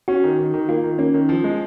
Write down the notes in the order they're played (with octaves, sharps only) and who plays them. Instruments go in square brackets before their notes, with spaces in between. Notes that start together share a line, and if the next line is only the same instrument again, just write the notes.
[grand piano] C#4 [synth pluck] F#4
[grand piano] D#3
D#3
D#3
[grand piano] A#3 [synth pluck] F4
[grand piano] D#3
[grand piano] A#3 [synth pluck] C#4
[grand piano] D#3
F3
G#3